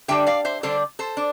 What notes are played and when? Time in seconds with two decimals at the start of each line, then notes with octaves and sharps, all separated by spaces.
0.08 D3 G3 D4 E5 G5
0.27 D5 F5
0.45 C5 E5
0.63 D3 G3 D4 A4 C5
0.99 A4 C5
1.17 D4